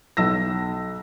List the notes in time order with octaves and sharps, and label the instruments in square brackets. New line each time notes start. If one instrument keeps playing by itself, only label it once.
[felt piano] B1 E6 A#6